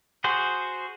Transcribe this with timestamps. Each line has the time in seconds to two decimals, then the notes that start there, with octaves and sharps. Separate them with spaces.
0.24 F#4 G#4 C5